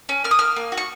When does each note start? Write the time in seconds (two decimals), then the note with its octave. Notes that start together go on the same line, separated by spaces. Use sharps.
0.09 C#4
0.24 A#3 F6
0.31 D#6
0.39 A#3 F6
0.56 A#3
0.72 F#4
0.77 C#6